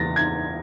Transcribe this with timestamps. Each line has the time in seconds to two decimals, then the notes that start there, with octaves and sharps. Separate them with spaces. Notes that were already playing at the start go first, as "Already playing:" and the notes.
Already playing: E2 A6 A#6
0.16 G#6